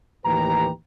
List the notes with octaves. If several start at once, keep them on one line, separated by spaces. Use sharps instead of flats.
D#2 A2 E3 G4 B4 A#5